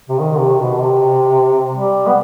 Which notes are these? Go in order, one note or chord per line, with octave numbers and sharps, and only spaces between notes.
C3
D#3
C3
B2
C3
G3
B3